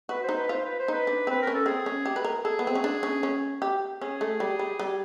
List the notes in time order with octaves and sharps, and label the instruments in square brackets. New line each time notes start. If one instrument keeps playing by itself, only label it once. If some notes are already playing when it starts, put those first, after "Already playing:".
[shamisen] F#4 [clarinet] B4
[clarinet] C5
[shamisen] D#4
[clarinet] B4
[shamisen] F4 [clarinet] C5
[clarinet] B4
C5
[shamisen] D#4 [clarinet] B4
[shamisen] D4
[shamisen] C4 [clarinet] B4
[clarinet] A#4
[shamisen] C#4
[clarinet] A4
[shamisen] C4 [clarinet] G#4
[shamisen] C#4
G4
B4
A#4
[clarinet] G#4 [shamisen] A4
[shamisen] B3
C4
C#4
D4
C#4
C#4
G4
[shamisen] C#4 [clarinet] G#4
[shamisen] A3
G3
G3
G3